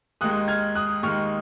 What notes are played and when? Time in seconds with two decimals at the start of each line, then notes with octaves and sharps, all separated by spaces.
0.21 D#2 D#3 G#3 D#4 D#6 F#6
0.48 F6 G#6
0.75 D#6 F#6
1.03 D#2 D#3 G#3 D#4 C#6 F6